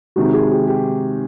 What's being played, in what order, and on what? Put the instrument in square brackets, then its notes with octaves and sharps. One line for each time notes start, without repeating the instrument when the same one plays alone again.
[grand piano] C3 D#3 G#3 [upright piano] F#4
[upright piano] G#4
G4
G4